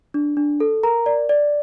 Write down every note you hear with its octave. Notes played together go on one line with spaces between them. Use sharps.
D4
D4
A4
A#4 A#5
D5
D5